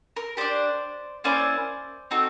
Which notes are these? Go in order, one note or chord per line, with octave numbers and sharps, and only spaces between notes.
A#4
D4 G4 C5 D5
A#3 C#4 E4 C5 D5
C4 D#4 F#4 A4